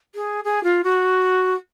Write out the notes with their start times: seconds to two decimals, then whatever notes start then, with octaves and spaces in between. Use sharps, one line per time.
0.15 G#4
0.44 G#4
0.63 F4
0.83 F#4